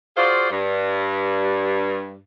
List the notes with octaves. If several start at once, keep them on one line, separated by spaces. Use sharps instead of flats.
F4 F#4 G#4 C5 D5 F5
G2